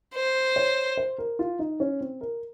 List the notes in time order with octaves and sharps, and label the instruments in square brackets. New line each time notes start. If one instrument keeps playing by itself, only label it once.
[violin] C5
[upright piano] C#5
C5
A#4
F4
D#4
C#4
C4
A#4